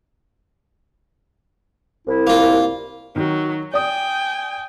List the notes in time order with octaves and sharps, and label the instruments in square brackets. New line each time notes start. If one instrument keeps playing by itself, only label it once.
[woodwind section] C2 E4
[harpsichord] A#3 F4
[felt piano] D#3 [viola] F#3
[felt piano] D5 D#6 [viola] G5 G#5